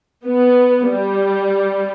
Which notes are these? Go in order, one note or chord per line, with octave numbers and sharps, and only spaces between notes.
B3
G3